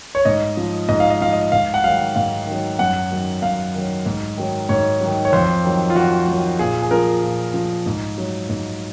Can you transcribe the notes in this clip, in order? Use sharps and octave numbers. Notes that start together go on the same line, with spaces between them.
C#5
G#2 D#5
F3
G#2 D#5
F5
D#5
F3 F5
D#5
G#2 F5
F#5
D#3 F#3 F5
G#2 F5
D#3 F#3
F#2 F#5
D#3 F#3
F#2 F5
D#3 F#3
G#2
D#3 F#3
G#2 C#5
D#3 F#3
C#5
F2 C5
D#3 F#3
F4
F2 F#4
D#3 F#3
A#2 G#4
G#4
F3 A#4
A#2
F3
G#2
F#3
G#2